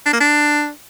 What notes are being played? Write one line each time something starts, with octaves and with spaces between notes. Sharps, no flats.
D4
A#3
D4